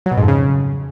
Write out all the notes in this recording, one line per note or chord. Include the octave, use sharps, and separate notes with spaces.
F#3
B2
G#2
F2
C#3